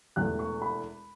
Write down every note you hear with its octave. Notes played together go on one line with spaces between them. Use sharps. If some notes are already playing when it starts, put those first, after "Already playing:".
E1 E2 E3 A3 F#6
C#6
B5